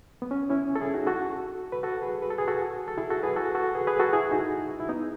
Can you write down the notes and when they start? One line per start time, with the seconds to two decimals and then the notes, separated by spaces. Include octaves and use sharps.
0.22 B3
0.31 C#4
0.50 C#4 E4
0.76 A4
0.81 E4 G#4
0.94 D#4 F#4
1.07 F#4 A4
1.72 B4
1.83 F#4 A4
2.02 G#4 B4
2.22 B4
2.30 A4
2.38 G#4
2.48 F#4 A4
2.88 A4
2.98 E4 G#4
3.10 F#4 A4
3.23 G#4 B4
3.36 F#4 A4
3.55 F#4 A4
3.75 G#4 B4
3.87 G#4 B4
4.00 F#4 A4
4.13 E4 G#4
4.31 D#4 F#4
4.80 E4
4.89 B3 D#4